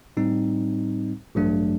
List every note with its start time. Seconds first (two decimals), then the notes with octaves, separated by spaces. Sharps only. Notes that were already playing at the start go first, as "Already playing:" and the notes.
0.17 A2 G3 C4 D#4
1.35 A1 G2 F#3 A3 D4